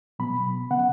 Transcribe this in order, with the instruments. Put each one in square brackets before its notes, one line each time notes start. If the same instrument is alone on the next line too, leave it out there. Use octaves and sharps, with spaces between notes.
[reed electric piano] B2 F#3 B3 B5
C#3 B3 F#5